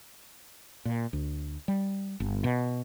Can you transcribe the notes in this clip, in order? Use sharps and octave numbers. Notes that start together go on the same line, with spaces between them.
A#2
D2
G3
G1
B2